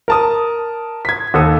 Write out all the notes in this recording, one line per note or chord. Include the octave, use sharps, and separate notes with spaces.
A#4 A5 D#6
G#6 B6
D#2 A4 D#6